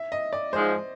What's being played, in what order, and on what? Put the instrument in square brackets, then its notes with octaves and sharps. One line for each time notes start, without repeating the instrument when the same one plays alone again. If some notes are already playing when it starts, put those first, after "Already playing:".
Already playing: [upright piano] E5
D#5
D5
[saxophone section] G#2 F3 G#3 [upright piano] C5